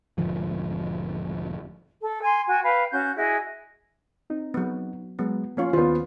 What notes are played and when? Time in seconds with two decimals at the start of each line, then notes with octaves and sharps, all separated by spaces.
0.18 E1 G#2 D3 F3
2.01 A4
2.22 G#5 C6
2.47 F#4 G5 G#5
2.63 B4 F5 G5
2.91 C#4 F#4 G6
3.15 E4 F#4 G#4 D#5
4.30 C4 D#4
4.54 F#3 B3
5.19 F#3 G#3 B3
5.57 F3 A#3 C#4 F4 C#5 C#6
5.73 D#2 D#3 B3 F4 C5